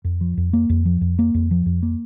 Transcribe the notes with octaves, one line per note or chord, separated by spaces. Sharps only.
F2
F3
F2
A#3
F2
F3
F2
A#3
F2
F3
F2
A#3